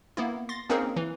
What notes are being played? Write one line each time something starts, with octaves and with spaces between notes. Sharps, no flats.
A#3 B3 E4
C6 A6 A#6
A#3 C4 C#4 D#4 G#4 A#4
E3